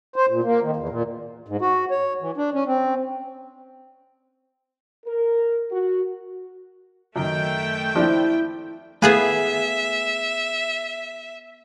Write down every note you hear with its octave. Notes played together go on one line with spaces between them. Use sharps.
C5
A#2
A#3
D#3
E2
A#2
G#2
F#4
C#5
E3
D4
C#4
C4
A#4
F#4
F#2 D#3 A3 G5
F3 D4 E4
A3 B3 G#4 B4 E5 F5 G#5